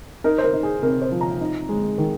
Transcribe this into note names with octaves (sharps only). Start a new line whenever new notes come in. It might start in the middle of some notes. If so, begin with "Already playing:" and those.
D#4 A#4
C5
A#4
D#4
G#4
C3 A#4
C5
F3
A#5
D#4
G#3
D#3